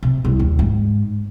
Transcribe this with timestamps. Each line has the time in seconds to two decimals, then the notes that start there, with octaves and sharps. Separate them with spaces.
0.03 C3
0.25 C2
0.39 D#2
0.59 G#2